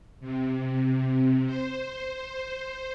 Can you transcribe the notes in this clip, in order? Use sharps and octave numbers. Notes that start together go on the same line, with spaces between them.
C3
C5